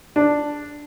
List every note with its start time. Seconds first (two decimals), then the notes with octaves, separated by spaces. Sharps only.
0.16 D4